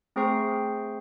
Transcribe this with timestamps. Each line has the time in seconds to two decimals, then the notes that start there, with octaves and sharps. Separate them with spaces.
0.16 A3 C4 G#4 C5 C#6 C7